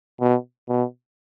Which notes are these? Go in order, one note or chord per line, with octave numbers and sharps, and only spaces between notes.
B2
B2